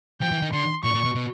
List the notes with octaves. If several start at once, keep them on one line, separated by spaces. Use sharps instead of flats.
F3 G5
E3
D#3
D3 C6
A#2 C#6
A#2
B2
B2